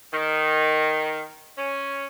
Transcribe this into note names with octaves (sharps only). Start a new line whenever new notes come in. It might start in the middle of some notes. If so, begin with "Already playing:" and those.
D#3
C#4